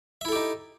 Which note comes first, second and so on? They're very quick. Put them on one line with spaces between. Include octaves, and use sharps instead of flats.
E5 E4 A4 G4 D#4